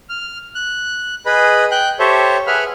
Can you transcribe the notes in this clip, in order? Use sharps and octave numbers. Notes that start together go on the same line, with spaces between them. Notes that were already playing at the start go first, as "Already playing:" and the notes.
F6
F#6
G#4 B4 D#5 B5
G5 F#6 G6
G4 A4 C5 C#5 E5
G#4 B4 E5 F#5 B5 F6